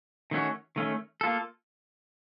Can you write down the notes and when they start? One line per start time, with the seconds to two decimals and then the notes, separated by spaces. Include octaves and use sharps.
0.31 D#3 A3 C#4 F#4
0.76 D#3 A3 C#4
1.21 A#3 F4 A4